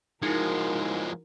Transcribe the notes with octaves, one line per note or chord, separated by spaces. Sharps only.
F3 G#3 D#4 E4 F#4 A#4